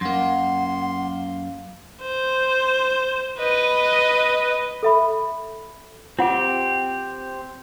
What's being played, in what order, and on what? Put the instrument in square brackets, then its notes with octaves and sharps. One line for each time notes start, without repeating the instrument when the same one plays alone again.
[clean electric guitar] F#2 A#3 [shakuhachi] F#5 [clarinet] C6
[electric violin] C5
B4 D#5
[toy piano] A4 E5 B5
[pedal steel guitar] C4 G4 [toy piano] F4 F#5